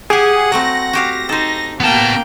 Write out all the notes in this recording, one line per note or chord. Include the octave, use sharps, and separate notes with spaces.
G4 G#4 F#5 G#5
F#3 A3 C4 A#6
F#4 G4 F5
D#4 A4 C5
A#3 B3 G5 A5